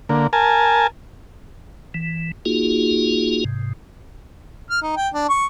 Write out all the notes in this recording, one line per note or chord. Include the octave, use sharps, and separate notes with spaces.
D3 A#3
A#4 G#5 A5
E3
A#3 D#4 F4 F#4 G#4
G#2 C3
F6
D#4
G5
D4
C#6